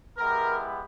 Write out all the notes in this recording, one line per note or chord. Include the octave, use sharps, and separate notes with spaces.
G#3 B3 E4 G4 A#4